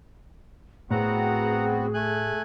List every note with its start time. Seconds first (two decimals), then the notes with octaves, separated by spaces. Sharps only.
0.91 A2 B3 C4 F#4 G#4 F#5 A#5
1.94 A3 G#5 F#6